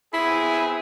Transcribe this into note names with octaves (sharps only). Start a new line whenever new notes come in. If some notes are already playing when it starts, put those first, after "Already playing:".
B3 C4 E4 G#4